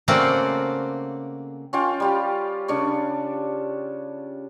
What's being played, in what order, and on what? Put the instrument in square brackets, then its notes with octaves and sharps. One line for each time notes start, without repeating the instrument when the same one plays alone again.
[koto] C#3 A3 A#3 C4 F#4 D5
[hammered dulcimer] C#4 F4 G5
G3 F4 G4
C#3 D4 C#5